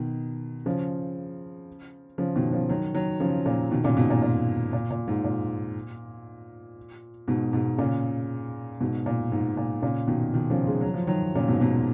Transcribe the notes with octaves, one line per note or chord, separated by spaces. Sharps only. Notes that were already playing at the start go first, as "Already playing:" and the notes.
Already playing: B2 D#3
C#3 F3
C#3 F3
B2 D#3
C#3 F3
D#3 F#3
D#3 F#3
C#3 F3
A#2 C#3
B2 D#3
A#2 C#3
G#2 B2
A#2
A#2
A#2
A#2
G#2
A#2
G#2 B2
G#2 B2
A#2 C#3
G#2 B2
A#2
G#2
A#2
A#2 C#3
B2 D#3
B2 D#3
C#3 F3
G#3
F#3
F3
D#3 F#3
A#2 C#3
G#2 B2
G#2 B2